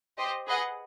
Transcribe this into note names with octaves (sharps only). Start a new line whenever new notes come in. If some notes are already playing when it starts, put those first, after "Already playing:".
G4 C5 D#5
G#4 B4 D#5 F#5